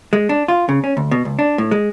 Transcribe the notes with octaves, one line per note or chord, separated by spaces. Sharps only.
G#3
D4
F4
C#3
C#4
D2
B2
C#2
D4
A2
G#3